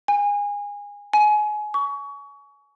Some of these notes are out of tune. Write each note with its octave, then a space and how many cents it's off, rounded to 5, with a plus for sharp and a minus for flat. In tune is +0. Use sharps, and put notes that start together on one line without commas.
G#5 -25
G#5 +25
C#6 +30